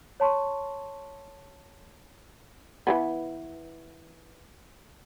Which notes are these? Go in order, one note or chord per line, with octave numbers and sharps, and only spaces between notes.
C#5 A5 C6 C#6
E3 A#3 B3